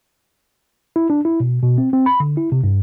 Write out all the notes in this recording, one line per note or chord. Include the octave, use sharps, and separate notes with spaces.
E4
D4
E4
B2
B2
C4
C4
B5
D3
E4
C3
G2